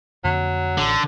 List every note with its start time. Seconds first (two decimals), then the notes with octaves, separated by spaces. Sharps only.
0.24 F2 D3 F#3 A#3
0.78 A1 D3